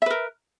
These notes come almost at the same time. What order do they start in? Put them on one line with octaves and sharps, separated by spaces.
E5 B4 A#4